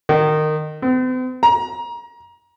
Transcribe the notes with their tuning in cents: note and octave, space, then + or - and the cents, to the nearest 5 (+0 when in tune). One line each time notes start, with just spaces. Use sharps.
D#3 -20
C4 -45
A#5 +25